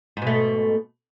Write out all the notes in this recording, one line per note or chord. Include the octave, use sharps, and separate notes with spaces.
G#2 B2 A3